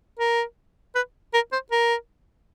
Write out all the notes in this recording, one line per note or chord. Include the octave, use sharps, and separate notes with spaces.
A#4
B4
A#4
C5
A#4